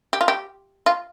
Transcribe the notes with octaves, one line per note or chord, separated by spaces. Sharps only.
G4
F4
G4
F4